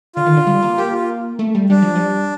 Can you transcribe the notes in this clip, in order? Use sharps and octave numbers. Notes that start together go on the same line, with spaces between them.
D3 F4
D#3
D3
G3
A#3
A#3 G4
F4
A3
G3
G3 D4
F3
G3